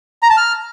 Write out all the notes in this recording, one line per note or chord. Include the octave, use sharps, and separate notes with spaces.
A#5
A5
F6